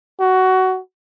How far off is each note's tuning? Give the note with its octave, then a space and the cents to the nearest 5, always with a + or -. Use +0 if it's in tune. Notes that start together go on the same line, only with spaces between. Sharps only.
F#4 +15